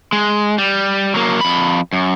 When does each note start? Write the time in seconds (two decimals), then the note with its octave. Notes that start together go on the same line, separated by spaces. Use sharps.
0.13 G#3
0.58 G3
1.14 F#3 A#3
1.41 F2 B5
1.93 F#2